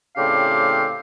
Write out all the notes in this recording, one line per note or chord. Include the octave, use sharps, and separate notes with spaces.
A2 C#3 C4 D4 G4 F5